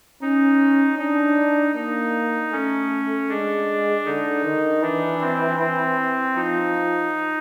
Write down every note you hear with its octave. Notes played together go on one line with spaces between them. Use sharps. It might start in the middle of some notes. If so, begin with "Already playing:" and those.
C#4 D#4
D4 D#4
A#3 D#4
A3 C#4
G#3 D4
D3 D#4
D#3
E3 D4
C4
C4
F3 D#4